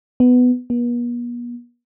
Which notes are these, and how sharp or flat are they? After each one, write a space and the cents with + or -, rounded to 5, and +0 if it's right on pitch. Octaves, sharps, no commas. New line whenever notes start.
B3 +10
B3 -45